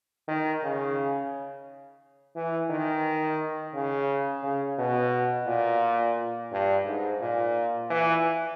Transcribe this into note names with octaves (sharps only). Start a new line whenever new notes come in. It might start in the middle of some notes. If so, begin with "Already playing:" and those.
D#3
C#3
E3
D#3
C#3
C#3
B2
A#2
G2
G#2
A#2
E3